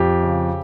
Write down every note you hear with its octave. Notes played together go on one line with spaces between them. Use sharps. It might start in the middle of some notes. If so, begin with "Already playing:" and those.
Already playing: F2 G4
C#3